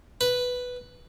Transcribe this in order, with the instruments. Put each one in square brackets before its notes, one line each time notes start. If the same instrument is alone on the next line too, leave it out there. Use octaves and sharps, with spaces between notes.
[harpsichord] B4